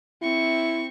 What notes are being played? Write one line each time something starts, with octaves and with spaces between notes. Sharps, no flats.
C4 E4 C#6